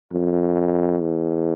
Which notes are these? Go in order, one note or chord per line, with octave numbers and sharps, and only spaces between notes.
F2
E2